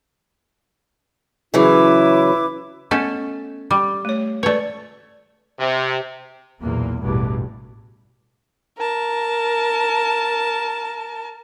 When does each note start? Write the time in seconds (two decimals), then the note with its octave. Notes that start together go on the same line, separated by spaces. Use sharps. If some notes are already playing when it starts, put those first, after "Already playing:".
1.54 C#3 E3 F#3 E4 B4 D6
2.91 A3 B3 C#4 A4 D#5
3.71 G3
4.05 A3 C#5
4.43 A3 B4 C#5 D5
5.59 C3
6.60 B1 E2 A#2 A#3
7.02 A1 E2 G2 B2
8.78 A#4 A5